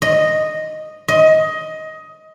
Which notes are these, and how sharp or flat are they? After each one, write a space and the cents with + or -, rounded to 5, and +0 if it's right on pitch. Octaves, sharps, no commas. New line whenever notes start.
D#5 -5
D#5 +15